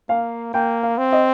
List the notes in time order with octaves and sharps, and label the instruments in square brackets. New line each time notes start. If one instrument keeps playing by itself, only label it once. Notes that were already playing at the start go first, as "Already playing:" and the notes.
[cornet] A#3 [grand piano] F5
[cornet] A#3 [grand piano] G5
[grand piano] F5
[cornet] C4
[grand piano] D#5